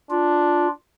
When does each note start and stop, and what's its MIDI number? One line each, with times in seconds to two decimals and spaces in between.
0.11 0.71 62
0.11 0.68 65